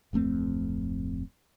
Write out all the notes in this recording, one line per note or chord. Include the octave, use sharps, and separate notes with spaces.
D1 F2 A3 C4